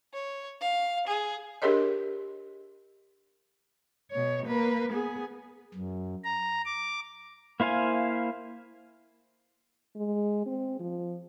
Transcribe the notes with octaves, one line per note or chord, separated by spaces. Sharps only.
C#5
F5
G#4
D4 G4 G#4 A#4 C#5 D#5
B2 C#5
A#3 B4
B3 G#4
F#2
A#5
D6
A#3 E4 C5 F5 G#5
G#3
C4
F3